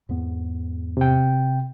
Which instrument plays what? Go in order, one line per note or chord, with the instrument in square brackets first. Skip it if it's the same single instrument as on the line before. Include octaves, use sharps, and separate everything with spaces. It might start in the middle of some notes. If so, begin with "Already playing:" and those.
[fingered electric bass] E2 G#2 B3
[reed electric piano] C3 G5